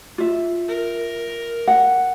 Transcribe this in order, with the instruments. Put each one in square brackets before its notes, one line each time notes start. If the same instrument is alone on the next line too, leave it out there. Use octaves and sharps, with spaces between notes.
[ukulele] F4 E5
[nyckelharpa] A#4
[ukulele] F#5